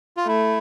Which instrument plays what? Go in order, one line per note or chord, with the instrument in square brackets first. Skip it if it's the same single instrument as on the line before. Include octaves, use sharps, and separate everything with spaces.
[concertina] F4
[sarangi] A3 [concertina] E4